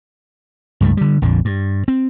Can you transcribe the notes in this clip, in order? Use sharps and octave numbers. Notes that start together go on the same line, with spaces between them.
C#2 G2 F3 A3
D3 G3
A#1 F2 D3
G2
C4